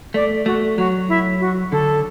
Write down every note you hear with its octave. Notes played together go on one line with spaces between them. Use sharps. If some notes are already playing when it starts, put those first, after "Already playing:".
A3 D5
A3 F#4
F#3 F#4
E4
F#4
D3 A4